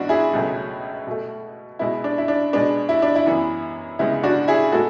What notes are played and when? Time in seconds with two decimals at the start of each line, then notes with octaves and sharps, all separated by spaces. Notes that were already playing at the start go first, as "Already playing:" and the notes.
Already playing: G#2 E3 B3 D4 F#4
0.09 E4 G#4
0.33 C#2 B2 F#3 A3
1.07 B2 A3
1.79 B2 G#3 B3 E4
2.04 D4
2.18 E4
2.28 D4
2.53 B2 G#3 B3 D4
2.89 E4
3.02 D4
3.15 E4
3.26 F#2 E3 B3
3.99 D2 C#3 G#3 B3 E4
4.23 D4 F#4
4.48 E4 G#4
4.72 A2 G#3 B3 F#4 A4